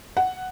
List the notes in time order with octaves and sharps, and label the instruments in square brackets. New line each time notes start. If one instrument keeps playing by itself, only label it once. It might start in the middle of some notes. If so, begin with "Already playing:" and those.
[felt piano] F#5